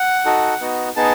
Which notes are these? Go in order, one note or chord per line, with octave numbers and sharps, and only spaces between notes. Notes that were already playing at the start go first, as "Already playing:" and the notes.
Already playing: F#5
D#4 F#4 A4
B3 D#4 F#4
B3 D#4 G#4 A5